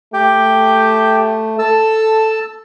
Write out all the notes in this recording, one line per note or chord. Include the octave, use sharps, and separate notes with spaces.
A3 G4 G5
A4 A5 E6